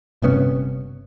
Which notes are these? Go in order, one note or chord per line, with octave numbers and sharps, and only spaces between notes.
G1 C3 B3 C#4